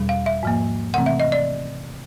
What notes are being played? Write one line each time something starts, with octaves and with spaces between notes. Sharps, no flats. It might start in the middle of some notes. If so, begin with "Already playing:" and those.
Already playing: E2 B2 G3
F5
E5
G#2 F3 A#3
C3 E3 A3 C4 F#5
E5
D#5
D5